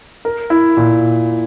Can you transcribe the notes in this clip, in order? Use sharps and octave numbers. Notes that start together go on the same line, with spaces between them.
A#4
E4
A#2